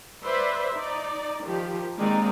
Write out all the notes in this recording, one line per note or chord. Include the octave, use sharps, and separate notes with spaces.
B4 C5 D5 E5
D#4 D5
D#3 F3 G4
D#3 G#3 A#3 C4 D#4 D5